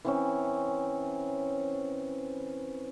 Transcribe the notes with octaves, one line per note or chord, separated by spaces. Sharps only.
E3 C4 C#4